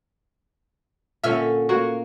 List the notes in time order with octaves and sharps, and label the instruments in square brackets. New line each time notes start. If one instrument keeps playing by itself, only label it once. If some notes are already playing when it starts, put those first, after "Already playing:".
[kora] A#2 D3 C#4 [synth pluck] E5 E6 F6
[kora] A#3 C#5 [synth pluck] F#4